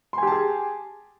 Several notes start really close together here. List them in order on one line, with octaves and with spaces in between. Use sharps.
C6 G#5 G4 A5 G#4